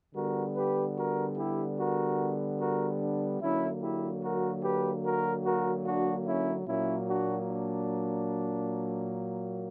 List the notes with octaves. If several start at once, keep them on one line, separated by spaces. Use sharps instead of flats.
D3 G3 B3 F#4 A#4
G4 B4
F#4 A#4
E4 G4
F#4 A#4
F#4 A#4
D4
D3 F#3 A#3 C#4 E4
E4 G4
F#4 A#4
G4 B4
F#4 A#4
F#4 A#4
D4 F#4
C#4 E4
A#2 F#3 A#3 C#4 E4
D4 F#4
D4